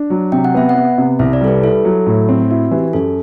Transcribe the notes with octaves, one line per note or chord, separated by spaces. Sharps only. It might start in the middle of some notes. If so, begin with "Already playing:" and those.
Already playing: D4
F#3
C3 G5
F#5
B3 E5
F#5
B3
C3
C2 E5
D5
G3 A4
B4
E4 A4
F#3
A2
C4
E4 F#4
E3 G4
F#2 A4